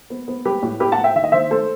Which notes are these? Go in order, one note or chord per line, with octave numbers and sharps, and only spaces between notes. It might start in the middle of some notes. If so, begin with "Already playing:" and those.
B3
B3
G3 G4 B4
A2
B3 G4 B4
F#5 A5
A2
E5 G5
D#3 E5
D#5
D#3 C5 E5
A3 A4 C5